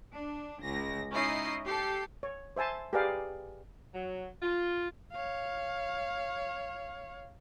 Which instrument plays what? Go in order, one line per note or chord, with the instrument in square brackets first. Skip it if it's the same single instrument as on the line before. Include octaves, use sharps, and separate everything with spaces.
[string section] D4
C#2 A#6
C#4 D#4 E4 D#5 C7
G4 A4 C7
[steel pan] C#5
C5 E5 G#5 A5 C6
G4 G#4 A#4 B4 D5 F5
[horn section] F#3
F4
[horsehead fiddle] C#5 F5